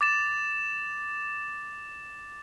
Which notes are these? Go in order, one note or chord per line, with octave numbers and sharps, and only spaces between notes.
D6 A6 E7